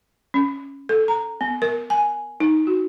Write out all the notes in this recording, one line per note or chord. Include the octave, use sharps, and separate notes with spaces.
C#4
A4
A#5
B3
A#4
G#5
D#4
F#4